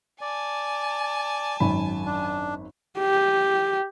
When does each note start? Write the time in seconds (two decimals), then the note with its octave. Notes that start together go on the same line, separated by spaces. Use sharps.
0.21 D5 G#5 A5
1.60 G#1 F#2 B5
2.06 D4
3.00 G4